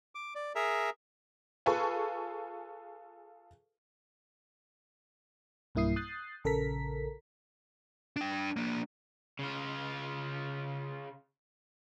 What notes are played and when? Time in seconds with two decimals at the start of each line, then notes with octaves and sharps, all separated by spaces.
0.15 D6
0.35 D5
0.55 G#4 A#4 E5 A#5
1.66 F4 G#4 A4 B4 G#5 C#6
5.75 B1 G2 A#3 E4 D#6 C7
5.96 D#6 F#6 G6 A6 C7
6.44 A#1 C#3 A4 A#4 A#5 B6
8.16 D4 G5
8.57 A#3 D4
9.39 C#3 F4